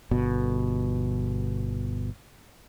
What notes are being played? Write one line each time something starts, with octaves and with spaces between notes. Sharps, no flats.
G1 B2